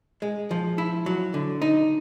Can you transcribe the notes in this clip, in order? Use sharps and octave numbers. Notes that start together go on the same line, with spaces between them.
G#3
F3
E4
F#3
D3
D#4